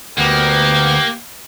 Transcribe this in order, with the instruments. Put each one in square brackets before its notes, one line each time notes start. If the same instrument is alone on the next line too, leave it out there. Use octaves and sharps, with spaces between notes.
[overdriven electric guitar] D2 [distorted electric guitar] A#3 [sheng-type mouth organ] B3 F#5 [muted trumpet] G4